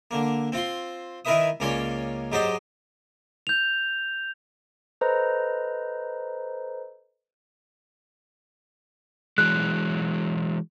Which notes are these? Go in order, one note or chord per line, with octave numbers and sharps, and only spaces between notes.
D3 A#3
C4 F4 C6
D#3 E4 A#4 B4 E5 D#6
C#2 A#3 C#4 C#5 D5 C6
G#2 F#3 G4 C5 D5 D#5
G6 F7
A4 B4 C5 D#5 A#5
E3 F#3 G#3 F#6